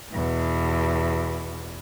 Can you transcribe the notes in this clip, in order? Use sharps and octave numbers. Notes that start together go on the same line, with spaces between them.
E2 B2